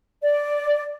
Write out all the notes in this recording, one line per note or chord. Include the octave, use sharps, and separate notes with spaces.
D5